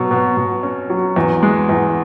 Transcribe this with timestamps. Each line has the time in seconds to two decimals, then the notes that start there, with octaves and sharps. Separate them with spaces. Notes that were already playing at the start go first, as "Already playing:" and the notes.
Already playing: B2 F#3
0.11 B2
0.37 B2
0.63 C#4
0.90 F#3
1.16 E2
1.43 G#3
1.69 E2